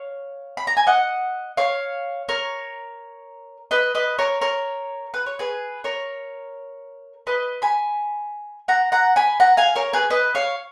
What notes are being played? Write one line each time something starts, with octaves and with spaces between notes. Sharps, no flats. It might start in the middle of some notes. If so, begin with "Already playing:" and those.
Already playing: C#5 F5
B5
A#5
G#5
D#5 F#5
C#5 F5
A#4 C#5
B4 D#5
B4 D#5
A#4 C#5
A#4 C#5
B4
C#5
G#4 B4
A#4 C#5
B4 D#5
G#5 B5
F#5 A#5
F#5 A#5
G#5 B5
F#5 A#5
F5 G#5
A#4 C#5
G#4 B4
B4 D#5
C#5 F5